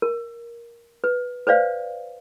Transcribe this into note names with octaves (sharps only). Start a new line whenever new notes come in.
A#4
B4
B4 C5 D5 F5